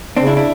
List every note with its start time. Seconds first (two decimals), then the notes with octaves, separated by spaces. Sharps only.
0.17 C#3 C4 D4
0.27 D4 E4
0.37 D4 E4